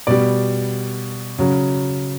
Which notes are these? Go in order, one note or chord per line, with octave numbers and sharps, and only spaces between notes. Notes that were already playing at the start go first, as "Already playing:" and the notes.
B2 G3 D5
C#3 F#3